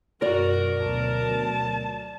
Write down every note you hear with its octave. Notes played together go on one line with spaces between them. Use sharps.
F#2 B2 F#4 A#4 D5
D2 B2 F#3 A5